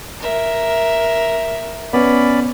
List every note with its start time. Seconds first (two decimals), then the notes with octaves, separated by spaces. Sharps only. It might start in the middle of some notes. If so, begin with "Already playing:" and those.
0.20 A#4 E5
1.93 B3 C#4 D5 B5